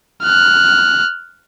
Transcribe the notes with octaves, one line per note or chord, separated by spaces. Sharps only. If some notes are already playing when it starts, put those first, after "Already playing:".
F6 F#6